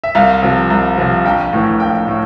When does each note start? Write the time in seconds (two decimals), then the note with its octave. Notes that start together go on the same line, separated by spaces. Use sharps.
0.04 E5
0.15 C2 F5
0.42 C3 F3
0.70 C2
0.98 C3 F3
1.25 A#1 G5
1.53 A2 E3
1.80 A#1 G5
2.08 A2